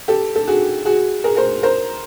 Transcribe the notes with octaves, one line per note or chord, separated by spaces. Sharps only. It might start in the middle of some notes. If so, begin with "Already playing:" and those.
G4 A4
A4
F#4 G#4
F#4 G#4
G#4 A#4
A#4 C5
A#4 C5